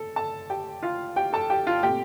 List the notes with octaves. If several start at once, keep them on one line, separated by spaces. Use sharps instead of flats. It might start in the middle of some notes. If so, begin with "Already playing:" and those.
Already playing: A4
A4 A5
G4 G5
F4 F5
G4 G5
A4 A5
G4 G5
F4 F5
A#2 A3 C4 G4 G5